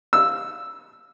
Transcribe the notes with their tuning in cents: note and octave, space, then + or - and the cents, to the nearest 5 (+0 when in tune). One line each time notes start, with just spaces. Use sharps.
E6 +0